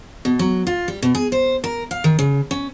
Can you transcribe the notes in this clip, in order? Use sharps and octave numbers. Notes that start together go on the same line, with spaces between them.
B2
F#3
F4
G3
B2
G#4
C5
A#4
F5
D#3
C#3
C#4